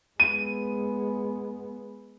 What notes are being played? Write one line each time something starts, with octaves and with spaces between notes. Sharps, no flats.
G#3 B3 D#7